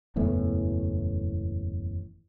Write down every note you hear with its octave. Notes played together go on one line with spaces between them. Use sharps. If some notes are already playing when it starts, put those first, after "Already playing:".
F#1 E2 A2 E3